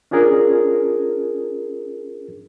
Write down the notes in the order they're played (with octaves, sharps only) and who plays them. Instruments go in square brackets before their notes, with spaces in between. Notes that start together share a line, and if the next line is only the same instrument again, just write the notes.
[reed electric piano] C#4 D4 F4 G#4 A#4